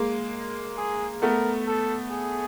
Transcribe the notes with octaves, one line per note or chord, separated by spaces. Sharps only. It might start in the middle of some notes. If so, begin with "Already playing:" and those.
Already playing: G#3 A#3
G#4
A3 B3 A#4
A4
G#4